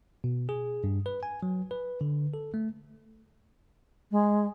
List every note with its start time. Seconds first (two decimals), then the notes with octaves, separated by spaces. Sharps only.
0.24 B2
0.49 G#4
0.84 G2
1.06 B4
1.23 G#5
1.43 F#3
1.71 B4
2.01 D3
2.34 A4
2.54 A3
4.11 G#3